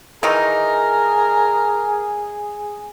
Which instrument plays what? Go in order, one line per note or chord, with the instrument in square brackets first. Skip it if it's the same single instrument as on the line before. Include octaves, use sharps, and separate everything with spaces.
[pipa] D#3 E3 D#4 [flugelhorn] G#4 [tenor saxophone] A#4